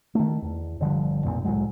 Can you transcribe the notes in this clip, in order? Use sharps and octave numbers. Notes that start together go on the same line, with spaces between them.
D#3 A3
E2
G1 D3 F3 G3
B1 F2 A#2
C2 A2 F#3 G#3